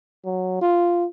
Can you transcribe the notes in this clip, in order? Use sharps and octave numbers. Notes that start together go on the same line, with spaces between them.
F#3
F4